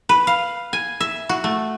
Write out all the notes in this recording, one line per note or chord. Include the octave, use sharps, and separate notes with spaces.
B4
F5
G#5
E5
F#4
A3